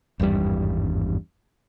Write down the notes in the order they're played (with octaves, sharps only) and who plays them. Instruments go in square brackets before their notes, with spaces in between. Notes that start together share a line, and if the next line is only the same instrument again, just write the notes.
[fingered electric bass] G#1 E2 G2 G3